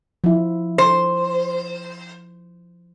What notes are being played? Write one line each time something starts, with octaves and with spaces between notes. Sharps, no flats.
F3 E4
C5